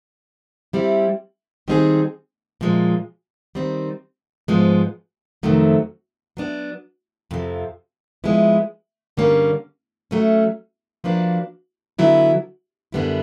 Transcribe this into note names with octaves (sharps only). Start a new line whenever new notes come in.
G3 C4 E4 G4
D#3 G3 C4 D#4 G#4
A#2 F3 G#3
D#3 G3 C4 D#4
G#2 F3 G#3 B3
F2 C3 D#3 F#3 A3
F#3 B3 D4
F2 C3 F3
F3 G#3 B3 E4
G2 D3 G3 A#3 C#4
F#3 A3 C#4
F3 A#3 D4 F#4 B4
D3 F#3 B3 E4
F#2 D3 G3 B3 E4